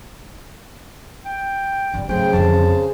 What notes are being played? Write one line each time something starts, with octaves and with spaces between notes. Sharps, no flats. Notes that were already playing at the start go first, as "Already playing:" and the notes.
G5
G1 D3 G3
C#3 F#3 A3 G#4 C5 G5
F2 D3 A5